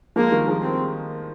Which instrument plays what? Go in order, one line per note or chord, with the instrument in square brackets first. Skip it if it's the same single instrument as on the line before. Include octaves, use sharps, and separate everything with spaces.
[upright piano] F3 G#3 [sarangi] A#3
[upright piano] D#3 G3
F3 G#3
[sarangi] C4